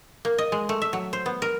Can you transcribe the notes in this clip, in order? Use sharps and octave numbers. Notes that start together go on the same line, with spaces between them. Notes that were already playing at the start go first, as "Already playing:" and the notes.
A#3
D#5
G#3
A3
E5
F#3
C5
B3
A#4